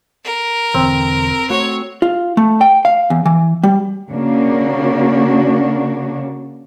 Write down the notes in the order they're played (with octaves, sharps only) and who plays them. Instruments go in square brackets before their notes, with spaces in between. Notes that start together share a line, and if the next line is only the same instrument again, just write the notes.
[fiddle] A#4
[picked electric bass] E1 D3 E3 [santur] C4
[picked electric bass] A3 [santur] F#4 C5 [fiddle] C#5
[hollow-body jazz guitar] F4
A3
G5
F5
E2
E3
G3
[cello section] C#3 A#3 D4 F#4